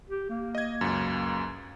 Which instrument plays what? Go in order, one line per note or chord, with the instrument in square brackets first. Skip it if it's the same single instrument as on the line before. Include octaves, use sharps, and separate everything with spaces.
[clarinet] G4
A#3
[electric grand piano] D#5 G#6
C#2 F#2